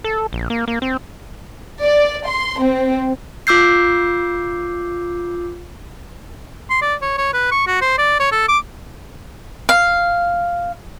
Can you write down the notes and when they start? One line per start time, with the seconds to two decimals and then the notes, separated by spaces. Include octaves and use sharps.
0.04 A4
0.33 A#1
0.50 A#3
0.68 A#3
0.82 C4
1.83 D5
2.26 C6
2.60 C4
3.47 F4 D6 E6 G6 C7
6.70 C6
6.82 D5
7.02 C#5
7.18 C#5
7.33 B4
7.51 C#6
7.67 F#4
7.81 C5
7.98 D5
8.20 C#5
8.32 A4
8.48 D6
9.69 F5